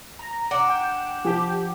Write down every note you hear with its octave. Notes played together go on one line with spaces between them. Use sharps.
A#5
D4 F#5
G5
F3 G4